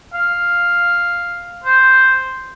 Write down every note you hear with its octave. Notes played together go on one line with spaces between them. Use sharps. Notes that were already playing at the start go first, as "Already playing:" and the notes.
F5
C5